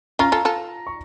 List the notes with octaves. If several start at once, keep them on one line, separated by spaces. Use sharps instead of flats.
C#4 F4 A#5
F4 A4
F4 A4
C#6